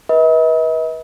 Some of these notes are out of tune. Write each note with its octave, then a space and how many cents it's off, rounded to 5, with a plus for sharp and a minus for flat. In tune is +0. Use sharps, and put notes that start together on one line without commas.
B4 -30 D#5 +45